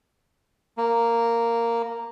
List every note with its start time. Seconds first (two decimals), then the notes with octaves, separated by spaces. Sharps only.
0.77 A#3